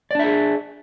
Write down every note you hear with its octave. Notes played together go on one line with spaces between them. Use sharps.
D4 G#4 D5 E5